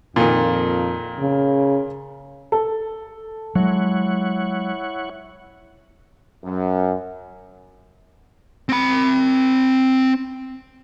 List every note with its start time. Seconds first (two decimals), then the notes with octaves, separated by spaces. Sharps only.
0.16 F2 A#2 D#3
1.19 C#3
2.52 A4
3.55 F#3 G#3 E4 C#5 F#5
6.44 F#2
8.69 C4 B5